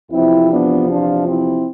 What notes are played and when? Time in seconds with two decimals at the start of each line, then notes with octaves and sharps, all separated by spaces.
0.11 E2 C3 F3 C4 E4
0.50 B3 D4
0.89 D4 F4
1.27 C4 E4